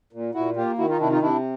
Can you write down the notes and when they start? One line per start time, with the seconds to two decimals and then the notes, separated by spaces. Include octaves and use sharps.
0.13 A#2
0.34 A#2 E4 F#4
0.56 A#3 F4 G4
0.78 D#3 E4 F#4
0.89 D#4 F4
1.00 C3 D4 E4
1.11 D#4 F4
1.22 C3 D4 E4